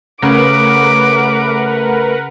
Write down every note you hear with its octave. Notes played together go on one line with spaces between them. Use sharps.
C#3 A3 A#4 B4 F#5 D6